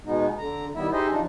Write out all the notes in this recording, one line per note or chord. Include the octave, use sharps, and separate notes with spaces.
B2 G#3 B3 D#4
D3 A#5
D#3 G3 B3 E4 E5
D#4 G4 G#4 C5 D#5 E5
F3 D4 D#4